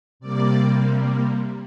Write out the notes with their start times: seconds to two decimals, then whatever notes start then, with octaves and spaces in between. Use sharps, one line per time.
0.20 C3 G3 A#3 D5